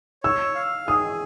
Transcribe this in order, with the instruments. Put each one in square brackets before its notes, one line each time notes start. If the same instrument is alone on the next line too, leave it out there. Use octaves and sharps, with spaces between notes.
[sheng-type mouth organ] C#5 [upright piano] E6
[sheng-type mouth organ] F5
[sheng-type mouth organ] G#4 [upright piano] D#6